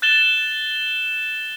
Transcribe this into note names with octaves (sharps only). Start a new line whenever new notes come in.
F#6 A6 E7 G7